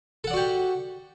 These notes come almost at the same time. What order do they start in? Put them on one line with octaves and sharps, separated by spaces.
A4 F#5 D5 F#4 G4